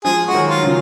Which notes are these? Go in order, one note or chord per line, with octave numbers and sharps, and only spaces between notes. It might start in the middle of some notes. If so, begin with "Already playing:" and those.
F3 G#3 G#4
G#3 F#4
D#3 F#3
F4
F#3
C#3 F3